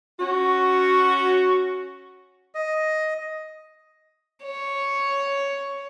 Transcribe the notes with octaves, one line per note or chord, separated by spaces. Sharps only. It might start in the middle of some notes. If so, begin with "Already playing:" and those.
C#4 F#4
D#5
C#5